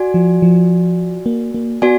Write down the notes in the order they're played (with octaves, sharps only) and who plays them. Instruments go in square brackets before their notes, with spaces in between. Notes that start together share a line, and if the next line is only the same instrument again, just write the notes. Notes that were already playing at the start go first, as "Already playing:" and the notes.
Already playing: [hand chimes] F#4 D5 G#5
[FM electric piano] F3
F3
A#3
A#3
[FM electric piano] B3 [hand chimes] F#4 D5 G#5